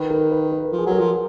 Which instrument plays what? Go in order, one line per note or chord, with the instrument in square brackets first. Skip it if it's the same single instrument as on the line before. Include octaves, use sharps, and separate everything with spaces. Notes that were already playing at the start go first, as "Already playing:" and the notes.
Already playing: [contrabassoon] D#3 [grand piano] B4
[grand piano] A#4
B4
B4
A#4
[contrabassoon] F3
[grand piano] G#4
[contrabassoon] F#3
[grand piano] A#4
[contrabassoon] F3